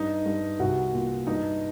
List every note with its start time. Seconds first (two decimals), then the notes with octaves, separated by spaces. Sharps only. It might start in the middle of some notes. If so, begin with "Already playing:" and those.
Already playing: G2 D#4
0.26 G2
0.59 C2 F#4
0.93 A#2
1.27 G2 D#4